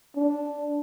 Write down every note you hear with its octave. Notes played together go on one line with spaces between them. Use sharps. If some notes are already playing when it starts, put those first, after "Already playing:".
D4